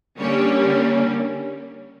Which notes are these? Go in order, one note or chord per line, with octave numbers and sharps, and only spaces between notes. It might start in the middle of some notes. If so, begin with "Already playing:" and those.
D3 G3 A#3 C#4 C#5